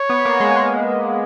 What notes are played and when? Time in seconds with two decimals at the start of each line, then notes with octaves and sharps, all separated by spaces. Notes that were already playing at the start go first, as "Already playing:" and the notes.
Already playing: C#5
0.10 B3
0.25 A#3
0.40 G#3
0.57 G#3